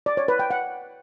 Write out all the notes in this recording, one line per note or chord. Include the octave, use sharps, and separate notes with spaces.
D5
C#5
B4
G5
F#5